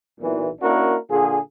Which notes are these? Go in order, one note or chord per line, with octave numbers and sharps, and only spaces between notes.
B1 A#2 E3
A#3 C#4 D4 E4 F#4 A#4
A#2 D3 F4 G#4